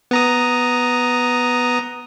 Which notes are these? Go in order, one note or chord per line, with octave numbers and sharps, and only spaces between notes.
B3 A#5 D#6